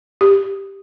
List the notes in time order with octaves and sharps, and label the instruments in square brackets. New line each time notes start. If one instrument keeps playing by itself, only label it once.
[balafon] G4